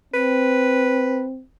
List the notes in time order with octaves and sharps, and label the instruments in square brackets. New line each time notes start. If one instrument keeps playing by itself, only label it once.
[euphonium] C4 [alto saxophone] B4